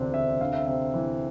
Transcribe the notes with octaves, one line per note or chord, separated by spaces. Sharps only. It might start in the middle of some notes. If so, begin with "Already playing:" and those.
Already playing: E1 D2 C3 C4 D4 F4
C3 E5
D2 F5
E5
C3 E5
E3